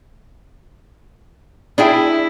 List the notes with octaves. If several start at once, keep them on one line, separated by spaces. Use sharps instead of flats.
D4 E4 G#4 G5